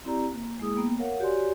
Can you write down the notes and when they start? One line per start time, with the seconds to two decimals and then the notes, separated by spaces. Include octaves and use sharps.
0.05 C4 E4 G4 D5 A#5
0.33 A#3
0.60 G#3 A#3 E4 G#4 D#6
0.76 A#3 B3 G5
0.99 A#4 C#5 F5 F#5
1.20 F#4 G4 C#5 D5 G#5 C6